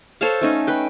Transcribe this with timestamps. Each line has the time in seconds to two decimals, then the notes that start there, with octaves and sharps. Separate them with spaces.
0.21 A4 C5 C#5 F5
0.41 A3 C#4 D#4
0.67 B4 G5